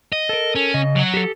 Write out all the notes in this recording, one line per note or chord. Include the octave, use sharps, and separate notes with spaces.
D#5
A4 A#4
C#4
C#3 D#5
F#3 F#4
G4 A4